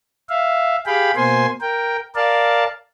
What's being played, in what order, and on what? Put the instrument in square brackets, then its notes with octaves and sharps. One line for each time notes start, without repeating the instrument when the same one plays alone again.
[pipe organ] E5 F5
G4 G#4 F5 G5 B5
B2 A#3 C5 G#5 C6
A#4 G5
A#4 D5 F5 A5